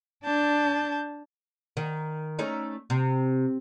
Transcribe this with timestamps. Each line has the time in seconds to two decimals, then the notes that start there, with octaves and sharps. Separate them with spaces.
0.25 D4 A5 G6
1.77 D#3
2.39 A3 C#4 D#4
2.90 C3